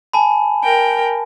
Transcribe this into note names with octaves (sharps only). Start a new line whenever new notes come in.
G#5 A5 B5
A#4 G5